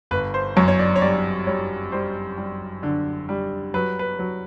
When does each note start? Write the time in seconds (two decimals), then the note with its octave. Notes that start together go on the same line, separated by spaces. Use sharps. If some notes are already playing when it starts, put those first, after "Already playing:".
0.11 G1 B4
0.34 C5
0.56 F#2 C#5
0.68 C#5
0.79 D5
0.96 C#5
1.01 G3 D5
1.47 G3 C#5
1.92 G3 C5
2.38 G3
2.83 D3
3.29 G3
3.74 F#3 B4
3.99 B4
4.19 F#3